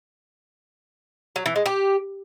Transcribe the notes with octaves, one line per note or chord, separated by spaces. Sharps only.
F#3
E3
G#3
G4